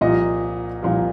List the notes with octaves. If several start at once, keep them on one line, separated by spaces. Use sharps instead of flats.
C2 A#2 F3 D#5
C2 A#2 F3